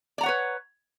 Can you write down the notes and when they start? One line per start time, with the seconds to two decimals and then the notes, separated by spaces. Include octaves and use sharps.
0.18 D5
0.21 A#5
0.23 F#5
0.26 C#5
0.28 B4